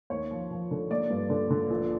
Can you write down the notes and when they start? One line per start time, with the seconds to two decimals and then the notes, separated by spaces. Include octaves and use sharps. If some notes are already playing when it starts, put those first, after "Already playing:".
0.10 D#2 C#5
0.31 F3
0.51 F3
0.71 D3
0.90 A#3 D5
1.10 G2
1.30 D3
1.50 D3
1.70 A#1